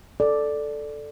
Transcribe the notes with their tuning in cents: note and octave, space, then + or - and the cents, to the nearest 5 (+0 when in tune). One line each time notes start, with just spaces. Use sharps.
A4 +0 D5 +0